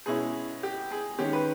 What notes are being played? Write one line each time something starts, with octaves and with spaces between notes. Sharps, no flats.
B2 G#3 C#4 E4 G#4
G4
G#4
D#3 G#3 C#4 G4
B4